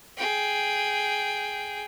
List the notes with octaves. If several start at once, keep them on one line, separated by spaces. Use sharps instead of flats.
G#4 G5